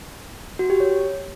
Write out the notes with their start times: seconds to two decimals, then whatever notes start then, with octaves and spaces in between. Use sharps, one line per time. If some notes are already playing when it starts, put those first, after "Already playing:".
0.59 F#4
0.70 G4
0.80 C#5